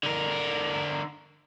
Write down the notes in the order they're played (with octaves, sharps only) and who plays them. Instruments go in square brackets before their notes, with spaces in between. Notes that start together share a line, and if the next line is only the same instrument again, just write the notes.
[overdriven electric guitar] D3 A#4